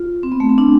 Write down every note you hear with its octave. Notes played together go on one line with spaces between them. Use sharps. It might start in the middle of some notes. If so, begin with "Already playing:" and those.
Already playing: F4
C4
B3
A3
C4
D4